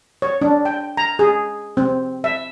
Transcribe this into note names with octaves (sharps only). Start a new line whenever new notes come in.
C#5
D4
G5
A#5
G#4
C4
E5